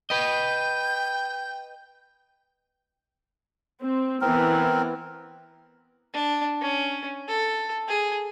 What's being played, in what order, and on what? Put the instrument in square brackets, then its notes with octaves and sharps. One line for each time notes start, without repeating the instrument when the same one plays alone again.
[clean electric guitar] B4 D#5 [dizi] G5 [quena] G6
[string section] C4
[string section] E3 B3 [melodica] C4 A#4
[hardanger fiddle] D4
C#4
A4
G#4